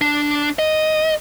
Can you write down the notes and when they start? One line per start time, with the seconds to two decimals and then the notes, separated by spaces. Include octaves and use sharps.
0.01 D4
0.59 D#5